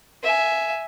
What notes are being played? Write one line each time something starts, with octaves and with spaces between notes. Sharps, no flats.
E5 G#5